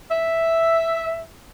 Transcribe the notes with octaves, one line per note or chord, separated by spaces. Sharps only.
E5